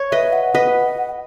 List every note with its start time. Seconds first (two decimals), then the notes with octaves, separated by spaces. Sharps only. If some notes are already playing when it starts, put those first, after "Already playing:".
Already playing: C#5
0.11 B4 D#5 E5
0.33 F#5
0.54 B4 D#5